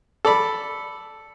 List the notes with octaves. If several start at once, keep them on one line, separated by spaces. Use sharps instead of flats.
A4 D5 B5